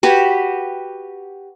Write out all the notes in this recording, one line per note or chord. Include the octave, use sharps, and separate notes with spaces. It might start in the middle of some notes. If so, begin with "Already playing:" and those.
F#4 G4 B4